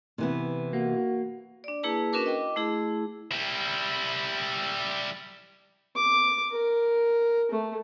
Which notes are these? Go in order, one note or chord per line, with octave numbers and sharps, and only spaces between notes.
C3 E3 B3
A#3 F#4
D4 D5
A#3 E4 G#4 B4 A5
C#4 D4 F#4 A#4 B4 D6
D#5 G5 D6
A3 E4 G#4
G3 E4
D6
A#4
A3